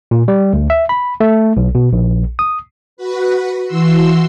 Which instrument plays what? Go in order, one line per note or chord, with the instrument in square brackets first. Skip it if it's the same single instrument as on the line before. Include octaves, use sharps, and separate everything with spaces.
[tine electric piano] A#2
G3
D2
E5
B5
A3
B1
B2
A#1
D#6
[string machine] F#4 B4
E3 F#4 C6 E6